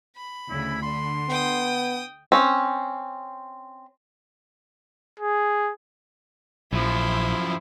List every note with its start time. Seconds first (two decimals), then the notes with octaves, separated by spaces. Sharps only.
0.16 B5
0.50 D2 C#3 E4
0.82 D3 C6
1.29 B3 G5 D#6
2.32 C4 C#4
5.20 G#4
6.73 A#1 F#2 F3 E4 C5